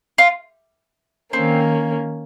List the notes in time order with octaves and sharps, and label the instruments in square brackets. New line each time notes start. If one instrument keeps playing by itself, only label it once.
[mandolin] F4
[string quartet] D#3 A#3 C#4 [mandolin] C4